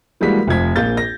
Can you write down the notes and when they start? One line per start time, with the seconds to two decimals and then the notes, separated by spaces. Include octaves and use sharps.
0.21 E3 G3 G#3 A#3 F#4 B6
0.47 F1 F3 G#6 B6
0.76 A#1 A#3 F4 G6 A6
0.97 A#6